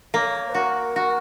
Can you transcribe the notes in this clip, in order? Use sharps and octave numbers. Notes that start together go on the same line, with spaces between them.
A#3 C#5
F#4 A#4
F#4